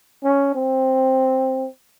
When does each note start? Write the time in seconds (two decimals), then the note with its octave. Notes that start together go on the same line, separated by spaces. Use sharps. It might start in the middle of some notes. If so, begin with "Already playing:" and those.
0.24 C#4
0.55 C4